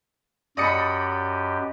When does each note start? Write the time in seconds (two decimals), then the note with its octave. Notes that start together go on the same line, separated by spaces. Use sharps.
0.57 F#2 G4 D5 D#5 B5 D#6 C#7